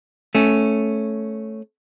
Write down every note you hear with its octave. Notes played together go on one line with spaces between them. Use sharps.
A3 C#4